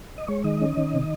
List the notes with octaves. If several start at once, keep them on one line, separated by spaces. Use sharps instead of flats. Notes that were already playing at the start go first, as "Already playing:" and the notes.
D#5
G#3 C#5
D#3 D#5
C#4
D#3
C3